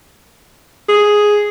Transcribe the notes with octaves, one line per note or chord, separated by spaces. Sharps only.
G#4